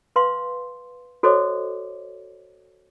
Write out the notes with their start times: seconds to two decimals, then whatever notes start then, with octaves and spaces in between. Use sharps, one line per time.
0.16 B4 F5 C6
1.23 F#4 A4 C5 C#5 D#5 D6